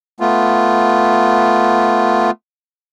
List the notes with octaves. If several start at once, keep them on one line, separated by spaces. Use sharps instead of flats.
A3 B3 F4